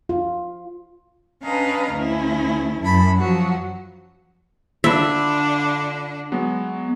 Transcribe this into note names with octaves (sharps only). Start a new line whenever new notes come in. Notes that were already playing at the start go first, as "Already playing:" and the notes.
F4
C#4 D4 B4 D#5 F5 A#5
D2 C#4 E4
F#2 A5 B5
F3 F#3 F#4
D3 D4 F4 E5 B5
F#3 G#3 B3